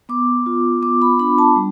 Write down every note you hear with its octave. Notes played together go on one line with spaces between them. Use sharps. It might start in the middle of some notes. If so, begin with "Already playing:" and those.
B3 D6
F4
B3 D6
B5
D4 B5
A5
G3